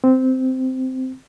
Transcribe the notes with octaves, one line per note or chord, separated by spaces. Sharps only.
C4